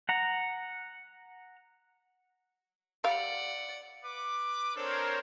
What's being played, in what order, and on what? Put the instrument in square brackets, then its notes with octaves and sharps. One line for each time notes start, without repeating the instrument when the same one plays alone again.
[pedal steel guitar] F#5 A#5
[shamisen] G3 F5 [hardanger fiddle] D5 F#5
[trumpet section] B4 D6
[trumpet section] C4 D4 A4 [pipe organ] A#4 C5 C#5